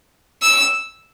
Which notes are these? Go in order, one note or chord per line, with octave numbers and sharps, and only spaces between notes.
E6